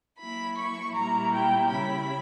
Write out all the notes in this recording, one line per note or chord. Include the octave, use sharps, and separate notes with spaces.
F#3 A#3 E4 B5
C#6
A#2 G3 A#3 E4 A#5
G5
C#3 G3 C#4 E4 B5